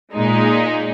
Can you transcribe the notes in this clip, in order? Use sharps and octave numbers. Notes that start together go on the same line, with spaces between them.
A#2 G#3 D#4